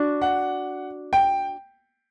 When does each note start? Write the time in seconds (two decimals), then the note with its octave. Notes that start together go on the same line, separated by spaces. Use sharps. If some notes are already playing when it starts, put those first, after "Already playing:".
Already playing: D4 F#4
0.21 F#5
1.13 G5